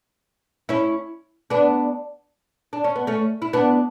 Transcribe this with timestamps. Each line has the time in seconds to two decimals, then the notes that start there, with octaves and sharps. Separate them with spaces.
0.69 C#4 E4
1.50 B3 D4
2.73 D4
2.84 C#4
2.96 B3
3.07 A3 C#4
3.42 E4
3.53 B3 D4